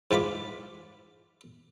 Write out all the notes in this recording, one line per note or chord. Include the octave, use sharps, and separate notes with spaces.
G#2 E3 F4 B5 D6